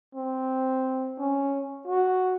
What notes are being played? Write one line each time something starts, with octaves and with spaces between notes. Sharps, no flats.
C4
C#4
F#4